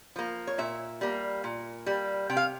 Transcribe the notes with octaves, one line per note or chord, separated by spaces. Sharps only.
F3 A#3
C#5
A#2 E5
G3 A#3
A#2
G3 A#3
C3 G5
F5